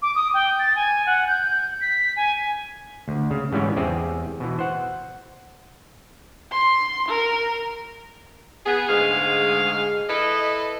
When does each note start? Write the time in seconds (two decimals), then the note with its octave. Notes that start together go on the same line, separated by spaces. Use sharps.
0.02 D6
0.15 D#6
0.34 G5
0.59 A6
0.76 G#5
1.06 F#5
1.27 G6
1.50 G6
1.81 B6
2.16 G#5
3.08 D2
3.31 C#3
3.52 G#2 E3 G3 B3 C#4
3.76 E2 C4 G4 G#4 E5
4.40 B2 E3
4.59 C5 F#5
6.52 C6
7.08 A#4
8.66 B3 G#4
8.89 D2 G#2 G#3 G#4 F5
10.09 E4 A4 B4 D#5